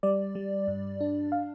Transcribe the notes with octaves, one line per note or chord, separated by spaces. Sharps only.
G3 D5
G3
G2
D4
F5